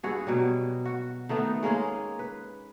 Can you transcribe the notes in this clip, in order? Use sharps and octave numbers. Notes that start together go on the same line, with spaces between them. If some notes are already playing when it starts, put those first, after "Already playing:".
G2 F#4 G#4
B2 F#3 G3
F#4
D#3 A3 B3 D#4
G#3 A#3 C#4 G#4
B4